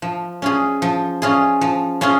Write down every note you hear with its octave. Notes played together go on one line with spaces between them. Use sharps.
F3
C#4 F4 G#4
F3
C#4 F4 G#4
F3
C#4 F4 G#4